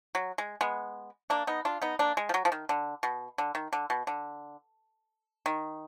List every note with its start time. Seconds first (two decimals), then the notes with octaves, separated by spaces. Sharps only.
0.15 F#3
0.38 G#3
0.61 G#3 B3
1.30 A#3 D4
1.47 B3 D#4
1.65 D4 F4
1.82 B3 D#4
1.99 A#3 D4
2.17 G#3
2.29 F3
2.34 F#3
2.45 F3
2.52 D#3
2.69 D3
3.03 B2
3.38 D3
3.55 D#3
3.73 D3
3.90 B2
4.07 D3
5.46 D#3